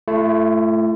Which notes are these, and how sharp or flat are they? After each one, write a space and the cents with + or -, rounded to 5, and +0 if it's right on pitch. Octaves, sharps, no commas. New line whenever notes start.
A3 -5 E4 +45